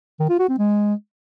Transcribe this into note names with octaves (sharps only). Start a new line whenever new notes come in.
D#3
F4
F#4
C4
G#3